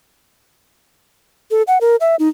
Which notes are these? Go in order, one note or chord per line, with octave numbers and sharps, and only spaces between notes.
A4
F#5
A#4
E5
D#4